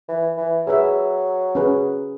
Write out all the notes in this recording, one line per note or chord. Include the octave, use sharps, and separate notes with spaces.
E3
E3
F#3 G#4 B4 E5
C#4 G#4 B4